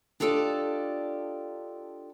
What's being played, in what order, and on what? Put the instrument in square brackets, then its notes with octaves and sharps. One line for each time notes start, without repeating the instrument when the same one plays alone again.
[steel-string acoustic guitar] D4 F4 G4 A4 D5 D#5